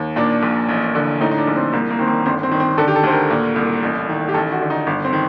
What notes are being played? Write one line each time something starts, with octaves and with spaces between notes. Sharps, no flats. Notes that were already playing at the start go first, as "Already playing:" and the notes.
Already playing: D#2
A#2 D4
A#1
A1
D3
A2 D#4
D#4
D4
A#1
C4
C2 A#3
A#3
D#3 C4
A#3
G1 C4
C4
D#3
C4
D3 A4
G4
A4
D2 C5
A#4
A#2
C2
A1
D#3
G4
A1 A4
F#4
D3
D#4
G1
C4
D#3